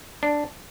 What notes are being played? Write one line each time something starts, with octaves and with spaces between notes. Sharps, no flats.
D4